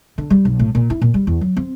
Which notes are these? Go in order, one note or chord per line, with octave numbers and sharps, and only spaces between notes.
D3
G3
B1
A2
A#2
E4
A#2
G3
E2
F#3
C4